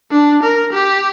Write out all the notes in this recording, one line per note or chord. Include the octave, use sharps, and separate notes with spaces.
D4
A#4
G4